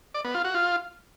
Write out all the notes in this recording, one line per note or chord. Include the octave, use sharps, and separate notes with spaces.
D5
B3
F4
F#4
F4